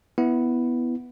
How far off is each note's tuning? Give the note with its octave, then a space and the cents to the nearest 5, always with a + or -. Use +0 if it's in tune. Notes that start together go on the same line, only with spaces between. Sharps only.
B3 +0 E4 +0